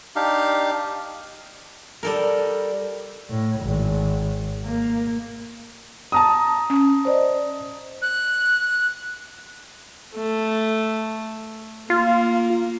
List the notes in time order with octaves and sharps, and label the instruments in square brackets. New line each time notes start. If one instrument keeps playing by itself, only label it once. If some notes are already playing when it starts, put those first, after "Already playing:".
[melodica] D4 D#4 G4 F5
[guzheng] G3 A4 A#4
[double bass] A2
G#1
A#3
[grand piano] A5 A#5 D#6
[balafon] C#4
[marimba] C5 D5 D#5
[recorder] F#6
[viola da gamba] A3
[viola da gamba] A#3 [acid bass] F4